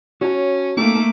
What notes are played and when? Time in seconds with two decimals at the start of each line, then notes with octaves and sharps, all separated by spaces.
0.21 C#4 F#4 C#5 A5
0.77 A3 A#3 C4 D#4 A4 D6